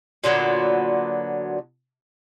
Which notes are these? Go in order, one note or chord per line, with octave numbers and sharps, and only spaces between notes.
A#2 D3 F#3 B3